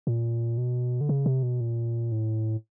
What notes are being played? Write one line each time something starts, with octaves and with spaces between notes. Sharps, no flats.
A#2
B2
D3
C#3
C3
B2
A#2
A2